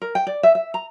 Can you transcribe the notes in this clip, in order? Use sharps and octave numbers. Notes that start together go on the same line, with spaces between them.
A#4
G5
D5
E5
E5
A#5